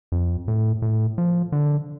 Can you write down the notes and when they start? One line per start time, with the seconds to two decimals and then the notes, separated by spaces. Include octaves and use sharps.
0.12 F2
0.48 A2
0.82 A2
1.18 F3
1.52 D3